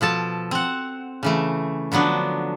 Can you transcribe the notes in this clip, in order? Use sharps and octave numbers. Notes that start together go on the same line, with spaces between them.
B2 F3 A4 A5
C4 F#5
C#3 E3 A3
D3 F3 F#3 B3 D4